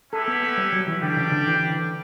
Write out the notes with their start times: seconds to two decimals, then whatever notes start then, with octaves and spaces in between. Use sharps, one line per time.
0.12 C#4 E4 G4 A4 B4 E5
0.28 B3
0.42 B3
0.57 G3
0.73 F#3
0.87 E3
1.02 D3 G3 D4 G4 D5 G5
1.17 C#3
1.31 D3
1.47 E3
1.70 D3